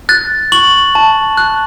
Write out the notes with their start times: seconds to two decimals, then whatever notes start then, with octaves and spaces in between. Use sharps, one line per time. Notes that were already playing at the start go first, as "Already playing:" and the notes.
0.09 F#6 A6
0.52 C#6 F#7
0.95 A5
1.37 F#6